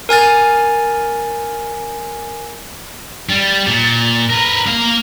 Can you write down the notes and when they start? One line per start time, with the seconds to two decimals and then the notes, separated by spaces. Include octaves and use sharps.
0.09 A#4 G#5 F6 A6
3.29 G3 A6
3.67 A#2
4.30 A#4 B4 A#5
4.67 A#3 F5